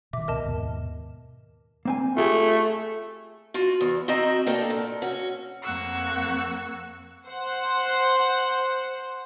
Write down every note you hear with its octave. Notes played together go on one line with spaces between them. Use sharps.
B2 D#3 E5 D6
C#2 B2 A#4 D#5 A5
D#2 G#2 B2
A#3 C4 G#5
A3 F4 G4 G#4
F4 F#4
E2
C4 F#4 D#5 E5 G5 A#5
A#3 D4 A4 G5
A#2
C#4 F#4
F2 A#3 F#5 C#6 E6
C5 F#5